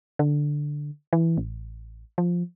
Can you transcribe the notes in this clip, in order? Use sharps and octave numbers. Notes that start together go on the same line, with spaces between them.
D3
E3
A1
F3